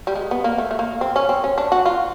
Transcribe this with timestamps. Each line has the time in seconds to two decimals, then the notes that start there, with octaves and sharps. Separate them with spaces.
0.07 G3
0.15 G#3
0.31 B3
0.44 A#3
0.58 A3
0.71 A3
0.79 A#3
1.01 C4
1.16 C#4
1.29 C4
1.44 C#4
1.58 D4
1.72 F#4
1.86 F4